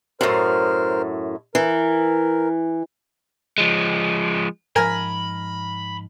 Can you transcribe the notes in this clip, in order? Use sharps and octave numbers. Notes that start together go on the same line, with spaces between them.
F#2 A2 A#4 C5 F6
E3 A#4
F3 G#3
G#2 F3 A#4 G#5 B5